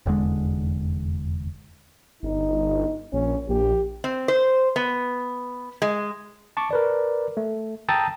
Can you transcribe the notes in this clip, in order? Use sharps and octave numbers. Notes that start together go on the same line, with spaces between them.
F1 E2 D3 G#3
G1 D#4
A#1 C#4
A#1 G4
C4
C5
B3
G#3
A5 C#6 D6
A#4 B4 D5
A3
G5 A5 A#5 D#6 E6 A6